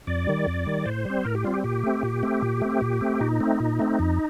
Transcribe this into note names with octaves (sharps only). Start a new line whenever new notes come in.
F2 D5
D#3 G3
F2
D#3 G3
A2 C5
G3 C4
A2 A#4
G4
G3 C4 F4
G4
A#2 G4
A3 C4
A#2
A3 C4
A#2
A3 C4
A#2
A3 C4
A#2 D#4
A3 C4
A#2
A3 C4
F2